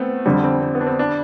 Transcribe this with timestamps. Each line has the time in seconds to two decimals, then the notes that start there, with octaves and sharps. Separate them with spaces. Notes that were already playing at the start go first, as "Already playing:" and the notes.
Already playing: A3 B3 C4
0.26 F2 D3 G3 C4
0.44 C4
0.62 C4
0.75 B3
0.81 D4
0.87 C4
0.99 D4